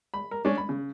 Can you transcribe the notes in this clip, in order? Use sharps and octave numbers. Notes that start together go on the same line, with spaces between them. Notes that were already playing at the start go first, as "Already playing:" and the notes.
B5
A#4
C#4 D4
B5
C#3